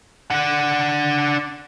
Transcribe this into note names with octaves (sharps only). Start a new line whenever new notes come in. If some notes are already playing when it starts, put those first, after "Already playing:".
D4 F#5